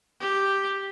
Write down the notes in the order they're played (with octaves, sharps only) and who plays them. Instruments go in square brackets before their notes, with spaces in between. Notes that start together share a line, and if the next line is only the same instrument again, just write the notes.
[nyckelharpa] G4